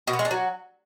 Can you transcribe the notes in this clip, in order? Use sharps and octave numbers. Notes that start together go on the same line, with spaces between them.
B2
B3
G#3
D4
F#3